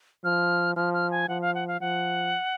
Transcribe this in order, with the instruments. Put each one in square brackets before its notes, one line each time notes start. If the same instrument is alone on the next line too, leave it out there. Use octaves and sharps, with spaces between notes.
[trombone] F3 [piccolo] F6
[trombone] F3 [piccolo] F6
[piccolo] F6
G#5
[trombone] F3 [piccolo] F#5
[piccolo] F5
F#5
F5
[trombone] F3 [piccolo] F#5